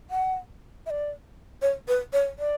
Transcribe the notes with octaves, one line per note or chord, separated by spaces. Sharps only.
F#5
E5
D5
C#5
B4
C#5
D5